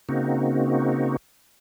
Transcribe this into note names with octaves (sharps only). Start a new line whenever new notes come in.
C#3 A#3 C4 D#4 F#4